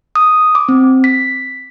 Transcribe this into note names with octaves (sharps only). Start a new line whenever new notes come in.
D#6
D6
C4
B6